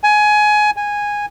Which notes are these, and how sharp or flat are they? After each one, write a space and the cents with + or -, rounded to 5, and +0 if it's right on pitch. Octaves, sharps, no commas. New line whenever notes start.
G#5 +20
G#5 -10